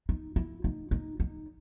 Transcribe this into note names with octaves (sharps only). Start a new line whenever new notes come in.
D#4
E4
D#4
D#4
D#4